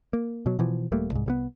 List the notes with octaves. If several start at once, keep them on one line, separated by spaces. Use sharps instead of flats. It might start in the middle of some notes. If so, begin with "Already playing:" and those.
A#3
B2 F#3
B2 E3 F3
D#1 G3 A3 A#3
C2 G#2
C2 G3 B3